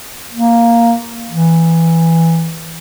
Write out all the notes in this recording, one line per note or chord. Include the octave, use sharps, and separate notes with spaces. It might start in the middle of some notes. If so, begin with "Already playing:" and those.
A#3
E3